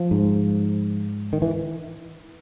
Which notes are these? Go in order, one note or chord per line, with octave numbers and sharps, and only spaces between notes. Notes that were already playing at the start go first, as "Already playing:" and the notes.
Already playing: F3
G#2
D#3
E3